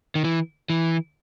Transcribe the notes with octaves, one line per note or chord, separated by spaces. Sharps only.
D#3
E3
E3